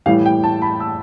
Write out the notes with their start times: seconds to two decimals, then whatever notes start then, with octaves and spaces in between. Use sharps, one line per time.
0.06 A2 E3 G3 F5
0.26 G5
0.44 A5
0.62 B5
0.80 E6